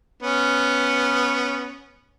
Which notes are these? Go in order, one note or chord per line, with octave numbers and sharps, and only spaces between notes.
B3 C#4